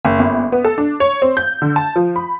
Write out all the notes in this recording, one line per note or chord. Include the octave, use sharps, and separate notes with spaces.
F#1
G1
B3
A4
D4
C#5
C4
G6
D3
A5
F3
B5